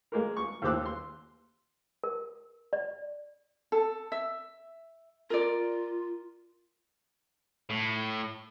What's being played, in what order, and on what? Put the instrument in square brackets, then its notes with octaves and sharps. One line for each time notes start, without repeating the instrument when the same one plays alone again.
[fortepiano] G#3 A#3 A#4
C#6
D#2 G4 C5 D6 E6 F#6
C6
[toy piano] A#4
D5
[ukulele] A4
E5
[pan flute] F4 [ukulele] A#4 D5
[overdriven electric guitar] A2